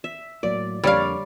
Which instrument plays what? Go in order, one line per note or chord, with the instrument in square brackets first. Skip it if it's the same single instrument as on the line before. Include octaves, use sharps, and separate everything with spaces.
[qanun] E5
[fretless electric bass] A2 F#3 A#3 [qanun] D5
[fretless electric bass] F2 D3 A#3 [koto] G3 F5 [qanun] C#5 D5